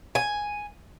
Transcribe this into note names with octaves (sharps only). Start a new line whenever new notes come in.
G#5